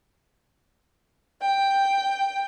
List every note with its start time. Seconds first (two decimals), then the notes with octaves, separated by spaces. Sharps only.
1.40 G5